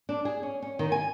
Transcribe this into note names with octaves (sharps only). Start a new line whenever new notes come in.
D4
G#4
C#4
C#4
D#3
G#5